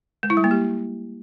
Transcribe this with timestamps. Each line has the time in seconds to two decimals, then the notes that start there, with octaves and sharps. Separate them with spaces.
0.23 G#3
0.30 E4
0.37 G3
0.44 A#3
0.51 G4